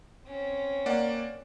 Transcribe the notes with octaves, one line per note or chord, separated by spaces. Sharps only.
C4 C#4
A#3 D5 F#5